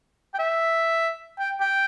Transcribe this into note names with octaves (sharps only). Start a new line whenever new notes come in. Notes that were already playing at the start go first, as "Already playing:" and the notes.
G5
E5
G5
G5